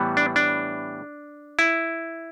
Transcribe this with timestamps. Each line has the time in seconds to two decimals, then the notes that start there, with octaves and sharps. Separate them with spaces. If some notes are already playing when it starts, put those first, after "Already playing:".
Already playing: A2 E3 G3 B3
0.17 D4
0.36 D4
1.59 E4